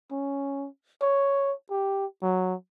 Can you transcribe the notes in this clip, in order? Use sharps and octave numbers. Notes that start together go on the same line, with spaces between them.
C#4
C#5
G4
F#3